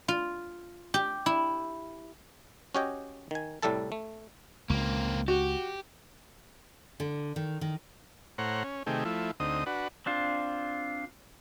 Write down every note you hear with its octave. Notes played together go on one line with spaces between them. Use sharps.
F4
G4
E4
C#4 F#4 G4 C#5 D#5 G5
D#3 G#5
C2 A2 G3 A3 A4 A5
A3
C#2 A#3 C4
F#4 G4
D3
D#3
D#3
A2 C5 C#5 F#5 A#5
C#4
C3 D#3 A3 G4 G#4
F3 A3 E4
D2 C4 D#4 D#6
D4 F#4 B4
C4 D4 F4